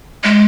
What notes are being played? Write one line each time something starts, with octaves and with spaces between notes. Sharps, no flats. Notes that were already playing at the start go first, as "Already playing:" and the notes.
G#3